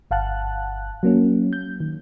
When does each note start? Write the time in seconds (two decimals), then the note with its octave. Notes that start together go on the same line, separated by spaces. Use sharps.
0.11 G1 F5 F#5 A5 F#6
1.03 F#3 A#3 C#4
1.53 G6
1.80 D#3